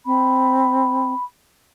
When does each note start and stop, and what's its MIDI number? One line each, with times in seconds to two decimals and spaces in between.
0.06 1.14 60
0.06 1.24 83